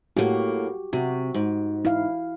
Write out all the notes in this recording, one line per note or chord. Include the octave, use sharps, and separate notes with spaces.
A2 A#3 F#4 G4
C3 F#4
G#2
E4 F5